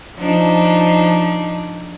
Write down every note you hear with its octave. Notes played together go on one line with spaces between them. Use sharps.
F3 D4 D#4